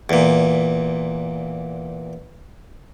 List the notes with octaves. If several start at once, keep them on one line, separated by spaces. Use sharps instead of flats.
E2 A#2